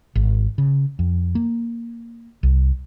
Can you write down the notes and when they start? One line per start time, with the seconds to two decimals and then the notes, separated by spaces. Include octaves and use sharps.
0.15 G#1
0.58 C#3
0.99 F2
1.35 A#3
2.43 C2